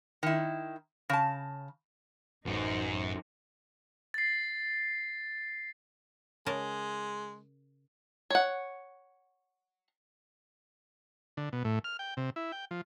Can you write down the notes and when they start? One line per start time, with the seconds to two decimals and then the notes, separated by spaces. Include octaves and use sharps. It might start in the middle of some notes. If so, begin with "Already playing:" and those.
0.23 D#3 E4
1.10 C#3 A5
2.46 A1 F#2 D#4 C5
4.14 A6 C7
6.46 C#3 G#3 A#4 A5
8.30 C#5 F#5
11.37 D3
11.53 B2
11.64 A2
11.84 F6
11.99 G5
12.17 C3
12.36 E4
12.52 G5
12.71 F3